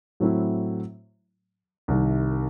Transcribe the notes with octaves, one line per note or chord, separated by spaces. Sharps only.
A2 F#3 A3 C4 E4
C2 C3 D#3